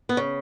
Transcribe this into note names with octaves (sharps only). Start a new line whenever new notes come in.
B3
C#3